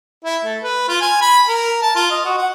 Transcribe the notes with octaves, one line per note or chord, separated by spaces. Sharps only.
E4
A3
B4
F4
G#5
B5
A#4
A5
F4
D#5
F#4
F#5